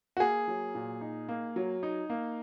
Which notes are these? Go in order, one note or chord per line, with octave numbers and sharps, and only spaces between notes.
F#4
A#3 G#4
F#3
A#2
D#4
A#3
F#3
D#4
A#3